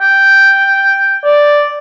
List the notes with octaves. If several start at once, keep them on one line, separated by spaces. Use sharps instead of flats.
G5
D5